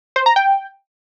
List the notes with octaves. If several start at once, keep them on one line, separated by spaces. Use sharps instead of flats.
C5
A#5
G5